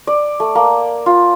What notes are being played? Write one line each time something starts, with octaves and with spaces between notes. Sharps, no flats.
D5
A3
A#3
F4